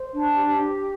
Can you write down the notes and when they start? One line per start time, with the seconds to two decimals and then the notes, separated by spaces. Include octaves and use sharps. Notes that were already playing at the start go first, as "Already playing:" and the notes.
Already playing: C5
0.12 D4
0.36 G4